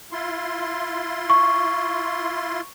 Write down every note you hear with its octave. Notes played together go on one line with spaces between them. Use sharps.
E4 F4 C6
C#6